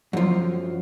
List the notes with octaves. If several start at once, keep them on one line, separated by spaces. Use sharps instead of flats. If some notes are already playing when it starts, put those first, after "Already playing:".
F#2 F3